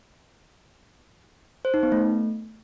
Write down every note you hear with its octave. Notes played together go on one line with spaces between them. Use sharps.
C5
D#4
B3
A3